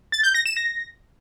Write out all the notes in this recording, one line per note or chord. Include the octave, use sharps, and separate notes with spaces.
A6
G6
A#6
E7
A#6